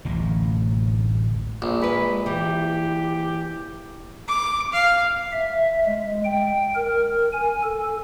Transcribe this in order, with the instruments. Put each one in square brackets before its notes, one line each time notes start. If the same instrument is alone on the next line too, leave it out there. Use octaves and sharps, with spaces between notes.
[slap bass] D1 A1 A2
[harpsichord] A#1 [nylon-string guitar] G3
[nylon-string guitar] G#3 B4 [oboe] B5
[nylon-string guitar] E3 [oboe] G4
[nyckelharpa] D6
F5
[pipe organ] E5
G#3
G5
A#4
G#5
A4